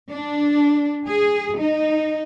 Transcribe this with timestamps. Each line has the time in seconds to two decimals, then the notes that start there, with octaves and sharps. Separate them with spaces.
0.11 D4
1.07 G#4
1.60 D#4